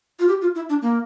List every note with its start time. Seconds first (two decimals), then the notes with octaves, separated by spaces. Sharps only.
0.19 F4
0.29 G4
0.41 F4
0.55 E4
0.69 D4
0.82 A#3